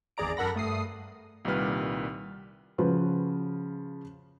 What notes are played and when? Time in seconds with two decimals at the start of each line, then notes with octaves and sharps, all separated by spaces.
0.17 G#1 E2 G#4 D5 A#5 D7
0.37 F#2 A4 A#4 F#5 B5 A#6
0.55 G2 A3 D#6 C7
1.45 C2 A#2 D#3 G3 B4 F6
2.78 C#3 F3 F#4 B4